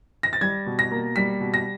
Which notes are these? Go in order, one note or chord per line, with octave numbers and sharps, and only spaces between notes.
A#6
A6
G3 G#6
B2
A#6
A#3
G3 B6
B2
A#6